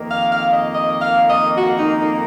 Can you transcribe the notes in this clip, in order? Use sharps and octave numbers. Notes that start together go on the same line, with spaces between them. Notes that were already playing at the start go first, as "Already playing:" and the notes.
Already playing: F2 D#3 A#3
F5
F5
D#5
D#5
F5
D#5
F#4
D#4
D#4